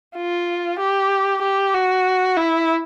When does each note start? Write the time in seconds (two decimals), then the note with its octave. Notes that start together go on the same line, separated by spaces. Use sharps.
0.16 F4
0.79 G4
1.42 G4
1.74 F#4
2.37 E4